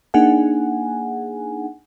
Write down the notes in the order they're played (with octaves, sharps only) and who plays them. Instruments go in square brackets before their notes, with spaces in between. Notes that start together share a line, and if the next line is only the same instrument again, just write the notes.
[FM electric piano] A#3 D4 D#4 G#4 F#5 G#5